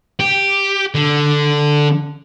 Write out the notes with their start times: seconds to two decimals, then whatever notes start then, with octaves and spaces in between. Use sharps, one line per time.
0.20 G4
0.95 D3